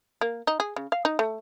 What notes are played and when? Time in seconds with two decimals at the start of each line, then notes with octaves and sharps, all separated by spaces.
0.21 A#3
0.47 D#4
0.60 G#4
0.76 C#3
0.92 F5
1.05 D#4
1.19 A3